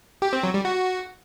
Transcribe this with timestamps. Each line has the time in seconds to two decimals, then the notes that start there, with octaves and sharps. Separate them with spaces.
0.22 G4
0.33 C4
0.43 F#3
0.54 G3
0.65 F#4